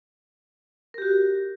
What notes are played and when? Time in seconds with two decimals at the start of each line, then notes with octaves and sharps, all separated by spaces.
0.94 A#4
0.98 G4
1.02 F#4